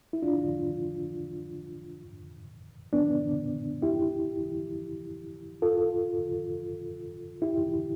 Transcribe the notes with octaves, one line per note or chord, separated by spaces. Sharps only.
E4
D4 F4
B3 D4
E4 G4
F4 A4
E4 G4